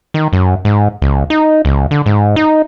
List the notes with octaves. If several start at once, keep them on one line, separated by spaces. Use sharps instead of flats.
D#3
F#2
G#2
C#2
D#4
C#2
D3
G#2
D#4